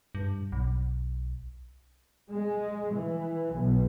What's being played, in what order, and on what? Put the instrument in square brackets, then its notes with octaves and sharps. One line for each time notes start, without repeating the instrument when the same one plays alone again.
[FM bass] G2
B1
[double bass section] G#3
E3
B1